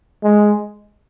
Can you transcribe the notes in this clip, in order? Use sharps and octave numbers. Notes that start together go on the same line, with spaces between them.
G#3